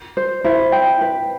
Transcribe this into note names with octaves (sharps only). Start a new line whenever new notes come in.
C5
E4 C5
G5
B4